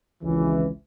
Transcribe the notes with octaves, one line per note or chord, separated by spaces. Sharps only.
G#1 C#2 E3